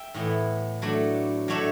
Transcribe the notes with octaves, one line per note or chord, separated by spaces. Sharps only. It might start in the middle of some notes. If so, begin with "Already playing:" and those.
Already playing: E5 G5
A2 E3 B3 E4
F#3 A3 D4
F#3 A3 D4 C#5 E5